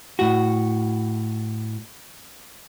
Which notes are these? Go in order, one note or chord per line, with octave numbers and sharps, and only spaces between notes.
A2 F#4